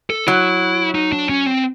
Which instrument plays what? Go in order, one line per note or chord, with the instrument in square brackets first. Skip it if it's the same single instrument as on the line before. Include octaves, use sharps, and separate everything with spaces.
[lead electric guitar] A4
[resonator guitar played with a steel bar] F#3 [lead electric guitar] E4
[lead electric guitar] D#4
D4
C#4
C4